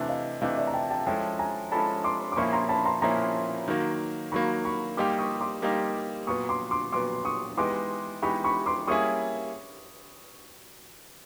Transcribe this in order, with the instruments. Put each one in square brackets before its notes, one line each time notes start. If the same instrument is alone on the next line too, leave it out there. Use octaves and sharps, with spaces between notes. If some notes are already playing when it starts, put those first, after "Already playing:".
Already playing: [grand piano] C3 E3 A3 D4 [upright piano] D5 E5
[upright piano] D#5 F5
[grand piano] C3 E3 A3 D4 [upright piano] D#5 F5
[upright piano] D5 E5
A#5
G5 A5
G5 A5
[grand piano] F3 G#3 C#4 E4 A4 [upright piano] G5 A5
[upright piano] G#5 A#5
[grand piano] F3 G#3 C#4 E4 A4 [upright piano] A5 B5
[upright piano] C6 D6
D6
[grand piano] A#2 F3 A#3 C#4 E4 [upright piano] B5 C#6
[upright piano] A#5 C6
A5 B5
A#5 C6
[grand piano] A#2 F3 A#3 C#4 E4 [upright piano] A#5 C6
[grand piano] D#3 F#3 A#3
[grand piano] D#3 F#3 A#3 [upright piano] B5 C#6
[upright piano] B5 C#6
[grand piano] G3 A#3 D#4 G4 [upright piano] C6 D6
[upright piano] C#6 D#6
C6 D6
[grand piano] G3 A#3 D#4 G4
[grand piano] A#2 F#3 B3 [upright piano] C#6 D#6
[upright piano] C6 D6
C6 D6
[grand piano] A#2 F#3 B3 [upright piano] C6 D6
[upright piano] C#6 D#6
[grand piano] E3 G#3 B3 D#4 G4 [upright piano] C6 D6
[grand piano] E3 G#3 B3 D#4 G4 [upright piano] B5 C#6
[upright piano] B5 C#6
C6 D6
[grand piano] G3 A#3 C#4 E4 G#4 [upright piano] C#6 D#6